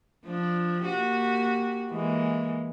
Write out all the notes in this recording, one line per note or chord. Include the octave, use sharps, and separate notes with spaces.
F3 D4
A#3 F#4 G4
E3 G#3 A#3